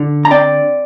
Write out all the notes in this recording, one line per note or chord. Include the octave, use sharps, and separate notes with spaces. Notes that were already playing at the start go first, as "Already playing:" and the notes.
Already playing: D3
A#5
C4 D5 G5